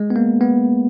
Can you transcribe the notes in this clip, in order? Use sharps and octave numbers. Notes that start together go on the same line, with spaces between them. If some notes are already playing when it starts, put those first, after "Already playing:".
Already playing: G#3
B3
A#3
B3